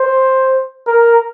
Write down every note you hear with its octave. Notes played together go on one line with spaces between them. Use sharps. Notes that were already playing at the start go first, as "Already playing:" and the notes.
Already playing: C5
A#4